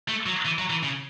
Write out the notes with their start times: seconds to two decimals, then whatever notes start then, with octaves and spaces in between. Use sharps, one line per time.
0.08 A3
0.26 F#3
0.45 E3
0.58 F#3
0.70 E3
0.83 C#3